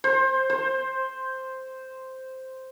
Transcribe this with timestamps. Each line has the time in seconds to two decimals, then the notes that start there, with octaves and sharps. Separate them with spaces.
0.04 C5
0.50 C5